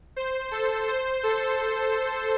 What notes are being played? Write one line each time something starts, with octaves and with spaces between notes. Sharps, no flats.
C5
A4
C5
A4